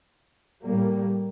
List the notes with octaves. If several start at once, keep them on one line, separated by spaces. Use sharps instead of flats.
A2 G3 A#3